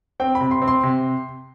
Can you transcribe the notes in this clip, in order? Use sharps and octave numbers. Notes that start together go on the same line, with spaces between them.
C4 G5
B5
C3
C6
C4
C6
C3